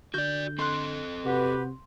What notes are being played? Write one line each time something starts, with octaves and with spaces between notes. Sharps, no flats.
D3 F#4 D5 G6
C4 A4 C6 F#6
C3 F#4 G4 B4